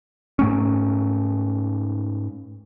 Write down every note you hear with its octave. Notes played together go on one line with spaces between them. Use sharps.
G#2 A3 C#4